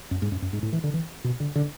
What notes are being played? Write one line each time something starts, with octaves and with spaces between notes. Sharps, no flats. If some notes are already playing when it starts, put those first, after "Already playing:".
F#2
G#2
F#2
F#2
G#2
A2
E3
D3
E3
B2
D3
D3